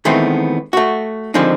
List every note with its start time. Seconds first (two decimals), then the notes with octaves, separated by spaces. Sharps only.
0.05 D#3 E3 G#3 A3 B3 C4
0.73 A3 F#4
1.34 D3 D#3 F3 G#3 C4 D#4